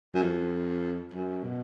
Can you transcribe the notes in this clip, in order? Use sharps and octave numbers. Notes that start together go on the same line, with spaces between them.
F#2
F2
F#2
B2